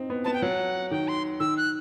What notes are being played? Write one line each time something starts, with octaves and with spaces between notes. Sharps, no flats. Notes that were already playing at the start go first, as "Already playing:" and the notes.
Already playing: C4 D#4
B3
B3 A5
G5
F#3 F#5
D#3 G5
C6
D#3 E6
F#6